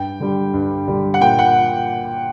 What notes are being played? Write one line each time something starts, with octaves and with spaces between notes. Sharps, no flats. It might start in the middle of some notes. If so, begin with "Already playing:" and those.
Already playing: G2 G5
D3 G3
G2
D3 G3
F#5
A#2 G5
F#5